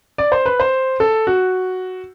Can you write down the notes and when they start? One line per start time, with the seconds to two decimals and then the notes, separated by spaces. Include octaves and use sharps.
0.18 D5
0.32 C5
0.46 B4
0.60 C5
1.00 A4
1.27 F#4